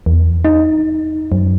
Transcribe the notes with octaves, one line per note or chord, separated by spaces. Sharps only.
E2
D#4
F#2